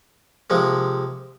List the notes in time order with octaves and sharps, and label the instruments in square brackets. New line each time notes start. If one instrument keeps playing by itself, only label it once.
[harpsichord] C3 F3 G#3 A#3